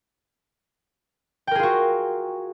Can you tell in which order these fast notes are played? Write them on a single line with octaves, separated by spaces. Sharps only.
G5 A#4 G#4 F4 F#4